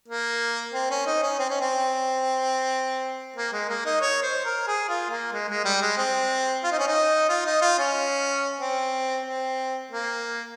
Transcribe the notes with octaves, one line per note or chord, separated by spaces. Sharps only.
A#3
C4
C#4
D#4
C#4
C4
C#4
C4
A#3
G#3
A#3
D#4
C#5
C5
A#4
G#4
F4
A#3
G#3
G#3
G3
G#3
C4
F4
D#4
C#4
D#4
F4
D#4
F4
C#4
C4
C4
A#3